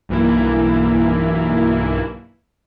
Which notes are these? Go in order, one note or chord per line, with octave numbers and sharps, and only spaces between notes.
B1 G2 E3 A#3 E4